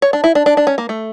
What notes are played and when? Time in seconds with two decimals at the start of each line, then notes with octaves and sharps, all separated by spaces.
0.02 C#5
0.13 D4
0.24 E4
0.35 D4
0.46 D4
0.57 D4
0.67 C#4
0.78 A#3
0.89 A3